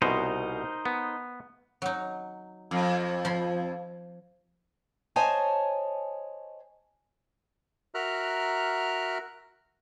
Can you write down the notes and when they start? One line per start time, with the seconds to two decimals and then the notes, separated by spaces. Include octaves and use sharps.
0.02 C2 B2 D#4 A#4 C5
0.85 B3
1.82 F#3 D#4
2.71 F2
3.25 F3 B5 C6
5.16 C5 C#5 D#5 G#5 A5
7.95 F#4 A#4 E5 A#5 F6 F#6